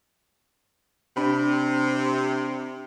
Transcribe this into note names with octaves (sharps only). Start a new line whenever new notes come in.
C3 D4 B5